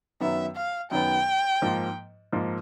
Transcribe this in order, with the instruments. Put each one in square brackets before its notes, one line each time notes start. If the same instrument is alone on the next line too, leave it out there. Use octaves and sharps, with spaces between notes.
[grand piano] F#2 D#3 F#3 B3 [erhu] E5
[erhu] F5
[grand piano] F#2 D#3 F#3 B3 [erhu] G5
[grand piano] G#2 F3 A#3
G#2 F3 A#3